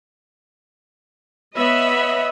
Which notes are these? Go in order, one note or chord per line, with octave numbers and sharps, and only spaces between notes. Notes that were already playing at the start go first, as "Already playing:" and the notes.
B3 C#5 D#5 E5 B5